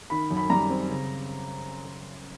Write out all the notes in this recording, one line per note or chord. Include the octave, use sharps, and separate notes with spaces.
D#3 B5
F#2
B5
G3 A#5
C4
C#3